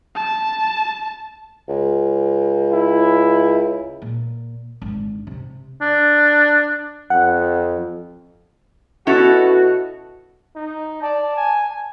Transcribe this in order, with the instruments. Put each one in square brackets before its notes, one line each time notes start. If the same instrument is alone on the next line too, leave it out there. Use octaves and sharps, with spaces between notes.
[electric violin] A5
[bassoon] C#2
[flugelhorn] E4
[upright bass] A#2
G#1 D3
C3
[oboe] D4
[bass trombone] F2 [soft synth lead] F#5
[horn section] B2 F#4 [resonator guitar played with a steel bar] C#4 E4 A4
[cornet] D#4
[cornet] D5 [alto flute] A5
[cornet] G#5